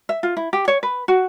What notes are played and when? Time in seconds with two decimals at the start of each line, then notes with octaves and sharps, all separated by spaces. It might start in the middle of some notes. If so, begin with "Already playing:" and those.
0.09 E5
0.23 F4
0.37 E4
0.53 G4
0.68 C#5
0.83 B4
1.08 F#4